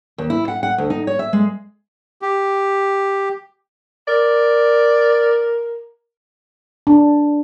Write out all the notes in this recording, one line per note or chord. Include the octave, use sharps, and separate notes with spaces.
D#2
E4
F#5
F#5
D2
D#4
C#5
E5
G#3
G4
A#4 D5
D4